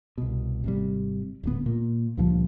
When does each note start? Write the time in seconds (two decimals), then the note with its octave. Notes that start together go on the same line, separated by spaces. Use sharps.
0.18 C2 B2
0.64 G#1 C3 G3
1.43 D1 G#2 D3 B3
1.66 A#2 A#3
2.17 C#2 G2 A#2 F3